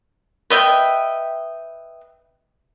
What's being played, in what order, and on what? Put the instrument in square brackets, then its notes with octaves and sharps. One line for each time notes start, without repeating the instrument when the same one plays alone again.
[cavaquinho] B4 D#5 E5 G5